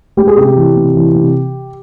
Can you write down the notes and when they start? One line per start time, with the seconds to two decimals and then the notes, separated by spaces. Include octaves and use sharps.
0.17 G#3 G4
0.27 G#4
0.37 C3 G4
0.56 E3
0.76 C3
0.95 E3
1.15 C3